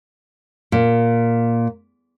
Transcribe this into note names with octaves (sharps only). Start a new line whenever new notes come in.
A#2